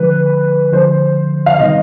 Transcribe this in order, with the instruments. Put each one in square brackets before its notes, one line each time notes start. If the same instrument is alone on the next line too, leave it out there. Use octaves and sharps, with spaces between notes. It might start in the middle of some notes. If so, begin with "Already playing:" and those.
Already playing: [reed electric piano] D3 F3 G#3 [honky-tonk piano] B4
[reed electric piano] D3 F3 G#3 [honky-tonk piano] C5
[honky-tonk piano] F5
[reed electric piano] C3 D#3 G3 B3 D#4 [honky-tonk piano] D#5